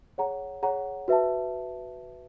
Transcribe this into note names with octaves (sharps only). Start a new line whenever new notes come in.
G#4 C#5 F#5 A#5
G#4 C#5 F#5 A#5
F#4 B4 E5 A5